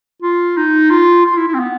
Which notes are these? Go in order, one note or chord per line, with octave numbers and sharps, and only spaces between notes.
F4
D#4
F4
F4
E4
E4
C4
B3